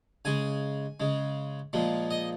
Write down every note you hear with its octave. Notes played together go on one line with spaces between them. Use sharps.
C#3 G#3 G#5
C#3 G#3
A#2 F3 G#3
D#5